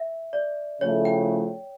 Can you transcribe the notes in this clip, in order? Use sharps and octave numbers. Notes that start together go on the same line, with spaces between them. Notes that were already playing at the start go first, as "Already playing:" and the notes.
Already playing: E5
D5
C#3 F3 A3 E4 C#5
G5